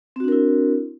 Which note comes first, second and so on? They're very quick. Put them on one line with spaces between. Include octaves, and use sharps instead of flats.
C4 F#4 D4 A#4 E4